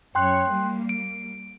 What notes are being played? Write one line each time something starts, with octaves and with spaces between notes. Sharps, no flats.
F#2 C#5 G5 C6 F#6
G3 A#3
D7